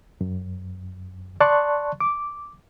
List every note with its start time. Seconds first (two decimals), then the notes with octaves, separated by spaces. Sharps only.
0.21 F#2
1.40 D5 A5 C6 C#6 F#6
2.00 D6